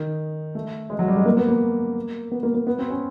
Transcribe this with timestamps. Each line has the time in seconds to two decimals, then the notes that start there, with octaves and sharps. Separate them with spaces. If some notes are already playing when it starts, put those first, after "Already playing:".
Already playing: D#3
0.55 A3
0.90 G#3
0.99 F#3
1.08 G3
1.17 G#3
1.26 A#3
1.37 B3
1.48 A#3
2.32 B3
2.43 A#3
2.55 A#3
2.67 B3
2.79 C4
2.90 C#4